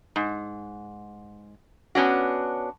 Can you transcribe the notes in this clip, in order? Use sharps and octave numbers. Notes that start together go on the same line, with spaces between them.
G#2
B3 C#4 D4 F#4